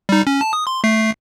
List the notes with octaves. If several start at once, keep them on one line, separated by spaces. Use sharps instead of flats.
G3 D#4
C#4
A5
D#6
C6
A3 C7